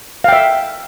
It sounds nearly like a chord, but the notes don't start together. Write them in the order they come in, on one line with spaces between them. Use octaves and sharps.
F5 G5 E5